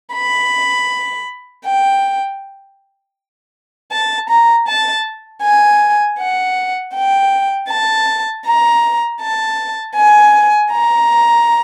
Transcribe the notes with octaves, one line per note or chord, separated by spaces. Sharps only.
B5
G5
A5
A#5
A5
G#5
F#5
G5
A5
A#5
A5
G#5
A#5